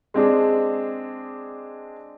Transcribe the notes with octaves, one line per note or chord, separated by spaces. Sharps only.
G#3 C4 D4 G#4